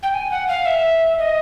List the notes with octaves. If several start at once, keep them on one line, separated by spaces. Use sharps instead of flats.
G5
G#5
F#5
F5
E5
D#5